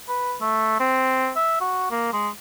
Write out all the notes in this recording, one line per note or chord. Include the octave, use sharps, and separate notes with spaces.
B4
A3
C4
E5
F#4
A#3
G#3